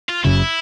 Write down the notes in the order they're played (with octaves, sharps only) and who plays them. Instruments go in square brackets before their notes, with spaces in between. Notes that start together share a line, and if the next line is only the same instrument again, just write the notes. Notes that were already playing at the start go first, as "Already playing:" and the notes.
[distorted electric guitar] F4
[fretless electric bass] F#1 F#2 C#3 [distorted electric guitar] E4